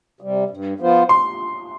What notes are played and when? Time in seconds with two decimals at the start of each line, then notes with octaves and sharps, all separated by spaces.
0.21 C3 G3
0.50 G2
0.79 F3 B3 F4 C5
1.09 C6